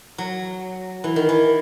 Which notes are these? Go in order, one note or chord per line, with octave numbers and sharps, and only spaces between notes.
F#3
E3
D#3
E3